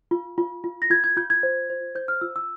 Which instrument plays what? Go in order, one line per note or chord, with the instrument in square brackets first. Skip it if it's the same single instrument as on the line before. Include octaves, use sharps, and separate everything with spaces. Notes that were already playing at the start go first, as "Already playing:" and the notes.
[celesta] F4
F4
F4
A#6
F4 G#6
G#6
F4 G6
G#6
C5
C5
C5 G6
F6
F4 E6
E6